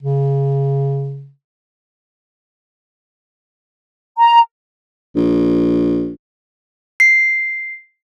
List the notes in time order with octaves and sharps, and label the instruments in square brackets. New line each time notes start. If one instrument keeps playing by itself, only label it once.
[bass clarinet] C#3
[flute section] A#5
[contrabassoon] A#1
[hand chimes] C7